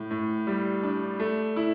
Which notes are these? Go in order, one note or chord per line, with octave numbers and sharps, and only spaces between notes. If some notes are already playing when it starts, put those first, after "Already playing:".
Already playing: A2
A2
G3
D4
A3
E4